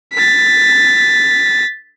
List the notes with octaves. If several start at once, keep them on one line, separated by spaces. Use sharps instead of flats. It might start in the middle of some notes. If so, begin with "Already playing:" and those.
A6 B6